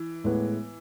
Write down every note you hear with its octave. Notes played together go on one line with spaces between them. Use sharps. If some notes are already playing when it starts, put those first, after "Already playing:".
Already playing: E3
A2 G#3 B3 E4 B4